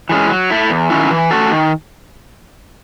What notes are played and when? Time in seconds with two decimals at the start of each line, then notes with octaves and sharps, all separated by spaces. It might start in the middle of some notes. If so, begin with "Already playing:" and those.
0.09 E3 G#3 C#4
0.29 F#3
0.50 A3 E4
0.70 E2
0.90 D#3 F#3 C#4 E4
1.11 E3
1.31 A3 C#4 F#4 A4
1.51 D#3